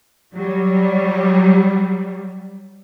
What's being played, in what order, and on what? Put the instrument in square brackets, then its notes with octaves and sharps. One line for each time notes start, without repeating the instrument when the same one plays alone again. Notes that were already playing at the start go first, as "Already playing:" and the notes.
[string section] F#3 G3